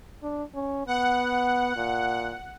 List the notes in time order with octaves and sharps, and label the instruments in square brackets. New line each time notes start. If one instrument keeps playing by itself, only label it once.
[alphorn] D4
C#4
[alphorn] B3 [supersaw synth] F#5
[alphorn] A#2